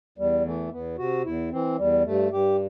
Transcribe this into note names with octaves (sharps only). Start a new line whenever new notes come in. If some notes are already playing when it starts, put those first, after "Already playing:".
E2 G3
E3 A3
E2 B3
C3 F#4
E2 E4
E3 C4
E2 G3
G2 A3
G2 G4